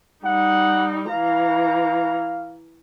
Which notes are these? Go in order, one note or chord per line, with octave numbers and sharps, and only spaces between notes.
G3 D#4 F#5
E3 F5 A#5